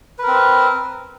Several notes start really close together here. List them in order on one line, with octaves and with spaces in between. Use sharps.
B4 A#4 C4